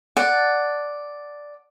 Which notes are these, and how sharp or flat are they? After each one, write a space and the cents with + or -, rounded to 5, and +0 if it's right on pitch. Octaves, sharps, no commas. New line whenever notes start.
D5 +0 F#5 +0 A5 +0